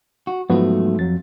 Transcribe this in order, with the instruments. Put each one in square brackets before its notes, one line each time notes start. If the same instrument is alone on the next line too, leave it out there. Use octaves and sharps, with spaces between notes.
[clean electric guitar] F#4
[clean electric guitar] G#2 F#3 A3 [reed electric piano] F3 B3 F#4
[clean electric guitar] F2 [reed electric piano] F#3 A6